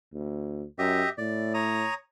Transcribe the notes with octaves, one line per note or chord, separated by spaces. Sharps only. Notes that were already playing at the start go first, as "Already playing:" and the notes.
D2
F#2 G4 D#5 E5
A2 D5
C#5 A#5 D#6